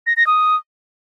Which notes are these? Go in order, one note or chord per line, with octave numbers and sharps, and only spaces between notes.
A#6
A#6
D#6